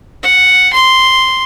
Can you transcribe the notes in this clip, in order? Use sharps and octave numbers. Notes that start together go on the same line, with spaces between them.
F#5
C6